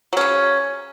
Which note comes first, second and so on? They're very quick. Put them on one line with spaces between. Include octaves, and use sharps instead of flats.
F#3 C#4 C#3